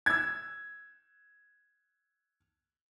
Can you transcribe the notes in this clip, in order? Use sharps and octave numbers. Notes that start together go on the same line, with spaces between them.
E6 G#6